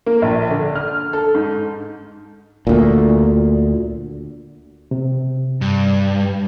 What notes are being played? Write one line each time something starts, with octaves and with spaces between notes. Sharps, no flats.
A#3
A#1
D3
F6
A4
G#2
D2 A#2
C3
G2